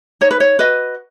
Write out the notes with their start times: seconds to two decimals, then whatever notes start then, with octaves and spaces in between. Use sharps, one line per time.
0.21 D#4 C#5
0.31 B4
0.40 C#5
0.59 F#4 B4 D#5